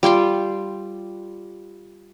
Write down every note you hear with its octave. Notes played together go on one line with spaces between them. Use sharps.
G3 F4 G5 C6